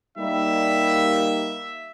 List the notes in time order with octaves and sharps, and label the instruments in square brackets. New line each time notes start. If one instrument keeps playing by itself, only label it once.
[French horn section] G3 A#3 D#4 [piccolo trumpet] E5